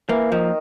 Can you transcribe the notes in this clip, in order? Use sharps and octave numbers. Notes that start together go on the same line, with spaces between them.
E3 A#3
D#3 F3